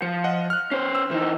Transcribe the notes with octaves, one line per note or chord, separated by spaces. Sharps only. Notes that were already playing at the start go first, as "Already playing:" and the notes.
F3 C#7
D#5 F#5
F6 F#6
C#4 C5 C7
E6
E3 D#4 C5